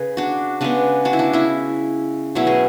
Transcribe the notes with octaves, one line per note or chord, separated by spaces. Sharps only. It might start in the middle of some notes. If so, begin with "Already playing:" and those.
Already playing: C#3 G#4 B4
D4 F#4
C#3 G#3 B3 D4
D4 F#4
E4
D4
C#4 E4
B2 F#3 A3 C#4 E4
G#4